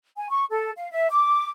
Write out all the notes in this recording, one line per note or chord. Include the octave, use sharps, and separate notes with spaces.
G#5
C#6
A4
F5
E5
D6